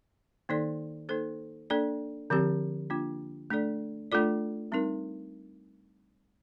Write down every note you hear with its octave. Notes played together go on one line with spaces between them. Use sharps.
D#3 A#3 D#4 A4 D5
A#3 D#4 A4 C5
A#3 D4 A4 D5
D3 F3 C4 G4
A#3 D4 F4
A3 D4 A4 D5
A3 D4 F4 A4 D5
G3 C4 D#4 A#4